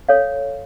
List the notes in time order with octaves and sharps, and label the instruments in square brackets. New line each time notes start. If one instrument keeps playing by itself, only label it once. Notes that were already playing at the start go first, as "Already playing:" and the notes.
[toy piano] A4 C#5 F5